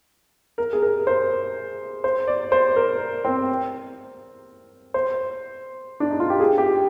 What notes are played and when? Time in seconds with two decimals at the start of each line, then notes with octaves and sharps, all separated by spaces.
0.58 A#4
0.73 G#4
0.82 A#4
1.07 C5
2.04 C5
2.28 D5
2.52 C5
2.76 A#4
3.25 C4
4.94 C5
6.00 D4
6.10 D#4
6.20 F4
6.30 G4
6.40 G#4
6.58 G4